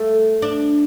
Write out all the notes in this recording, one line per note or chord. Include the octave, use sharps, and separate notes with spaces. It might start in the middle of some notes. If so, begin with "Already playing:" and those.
Already playing: A3
D4